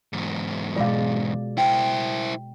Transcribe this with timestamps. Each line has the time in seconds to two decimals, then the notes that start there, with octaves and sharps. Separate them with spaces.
0.13 E2 G#2
0.76 B2 G#3 F4 D5 F5
1.58 E4 C5 G5 A5